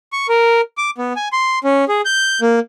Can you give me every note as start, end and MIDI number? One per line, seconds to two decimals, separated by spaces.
0.13 0.27 85
0.29 0.61 70
0.77 0.90 86
0.98 1.13 59
1.16 1.28 80
1.33 1.59 84
1.64 1.85 61
1.89 2.01 68
2.05 2.40 91
2.41 2.59 58